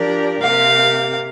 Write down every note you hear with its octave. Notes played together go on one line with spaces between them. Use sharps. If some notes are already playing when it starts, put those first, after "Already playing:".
Already playing: F3 D4 G4 A#4 D5
C3 A#3 G4 F5